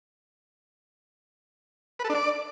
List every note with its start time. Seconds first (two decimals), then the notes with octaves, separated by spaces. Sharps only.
1.99 B4
2.05 A4
2.10 D4
2.15 D5